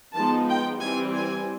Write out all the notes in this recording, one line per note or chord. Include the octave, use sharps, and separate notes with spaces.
F3 G#3 B3 D#4 A5
G5
E3 G3 C4 G#5
G#5